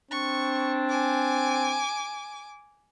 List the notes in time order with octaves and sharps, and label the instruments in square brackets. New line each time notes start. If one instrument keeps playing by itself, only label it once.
[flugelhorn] C4 [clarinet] D4 [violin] C#6
[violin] G#5 D6